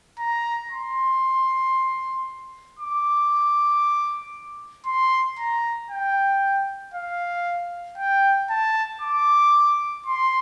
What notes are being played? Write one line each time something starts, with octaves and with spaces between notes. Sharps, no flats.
A#5
C6
D6
C6
A#5
G5
F5
G5
A5
D6
C6